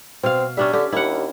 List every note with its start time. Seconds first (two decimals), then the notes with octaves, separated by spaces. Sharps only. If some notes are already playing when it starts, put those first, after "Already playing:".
0.23 B2 C4 F5
0.57 G3 C#4 D4 E5
0.73 D3 G4
0.92 D#2 E4 F#5